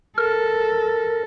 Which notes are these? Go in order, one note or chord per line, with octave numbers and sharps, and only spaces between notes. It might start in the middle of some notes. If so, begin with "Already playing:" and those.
A4 A#4